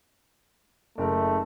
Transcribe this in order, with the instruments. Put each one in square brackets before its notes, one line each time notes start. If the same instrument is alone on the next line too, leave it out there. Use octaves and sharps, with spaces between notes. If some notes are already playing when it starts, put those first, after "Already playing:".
[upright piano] F#1 A#4 [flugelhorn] A3